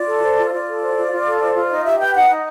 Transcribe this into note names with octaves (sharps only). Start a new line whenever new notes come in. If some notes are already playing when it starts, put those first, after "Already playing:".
Already playing: F4 D5
A4
C5
F4
D#5
F4 D5
A4
C5
F4
F4
A4
C5
F4
D#4 D#5
G4 E5
B4 G5
D#4 F#5
D#4